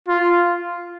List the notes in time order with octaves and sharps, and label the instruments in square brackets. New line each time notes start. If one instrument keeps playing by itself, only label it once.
[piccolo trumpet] F4